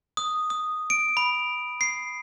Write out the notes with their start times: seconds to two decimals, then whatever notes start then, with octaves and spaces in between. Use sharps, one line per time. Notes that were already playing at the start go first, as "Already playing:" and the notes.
0.17 D#6
0.50 D#6
0.90 D7
1.17 B5
1.81 C7